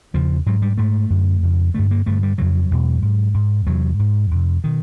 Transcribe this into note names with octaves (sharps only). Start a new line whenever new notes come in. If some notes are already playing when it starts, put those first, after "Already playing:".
E2 C#3 F3
G#2 F#3
G3
G#2 A3
F#2 D3
F2 C#3
G2 D3 A3
A#3
G2 D3 A3
G3
F2 C#3 F#3
E2 B2
G#2
G#2
E2 C3 F#3
G#2
F2 C3
B2 D#3